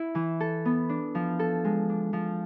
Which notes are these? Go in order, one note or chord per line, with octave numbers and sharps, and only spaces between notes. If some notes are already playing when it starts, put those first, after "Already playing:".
Already playing: E4
E3
A4
B3
D4
F3
A4
G#3
D4
F3